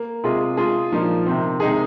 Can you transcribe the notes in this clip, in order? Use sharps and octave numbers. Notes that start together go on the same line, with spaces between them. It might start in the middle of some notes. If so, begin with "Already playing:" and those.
Already playing: A#3
C3 G#3 F4 G#4
G#3 F4 G#4
A#2 F3 A#3 D#4 A#4
C3 D#3 C4
C3 D#3 G#3 D#4 G#4